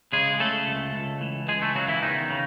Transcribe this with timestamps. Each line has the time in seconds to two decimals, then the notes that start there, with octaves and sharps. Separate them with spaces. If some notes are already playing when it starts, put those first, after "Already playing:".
0.13 C#3 G#3 G#4
0.40 C#3 A3 A4
0.67 C#2
0.94 C#2
1.21 E3
1.48 C#2 G#3 G#4
1.62 A3 A4
1.75 C#3 F#3 F#4
1.88 E3 E4
2.02 E2 D#3 D#4
2.30 C#3